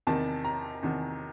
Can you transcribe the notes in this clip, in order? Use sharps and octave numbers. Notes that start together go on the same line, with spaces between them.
E2 C3 D#3 A5
A#5
E2 C3 D#3